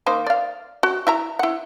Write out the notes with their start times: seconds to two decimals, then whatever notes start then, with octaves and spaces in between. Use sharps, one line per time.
0.06 D#3 A#3 C5
0.27 D5 F5
0.83 F#4
1.07 E4 E5 A#5
1.39 E4 F#5